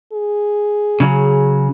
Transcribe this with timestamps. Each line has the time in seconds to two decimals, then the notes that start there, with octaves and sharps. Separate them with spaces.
0.13 G#4
1.00 C#3 F#3